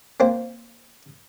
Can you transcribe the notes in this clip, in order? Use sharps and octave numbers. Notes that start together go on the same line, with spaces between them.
A#3 C4 C5